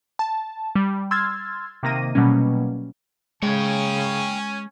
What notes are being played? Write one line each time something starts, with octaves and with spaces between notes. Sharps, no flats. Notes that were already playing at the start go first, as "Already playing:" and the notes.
A5
G3
C6 E6 F6 G#6 A6
C3 D#3 A#3 A#6 D#7
B2 F#3 G3 A#3 C#4
C#3 G#3 C#4 C#5 G5 G#5